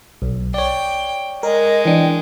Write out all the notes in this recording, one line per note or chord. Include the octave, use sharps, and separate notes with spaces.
B1
C#5 D5 G5
G#3 A#4 D#5
E3 D4 G5